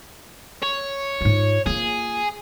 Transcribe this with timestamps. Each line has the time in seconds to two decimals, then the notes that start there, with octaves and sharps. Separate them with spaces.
0.63 C#5
1.21 G#2 F4
1.66 A#3 F4 G#4